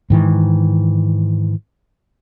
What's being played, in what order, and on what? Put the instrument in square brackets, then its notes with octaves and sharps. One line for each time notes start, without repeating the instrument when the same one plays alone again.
[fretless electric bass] G#2 D#3 E3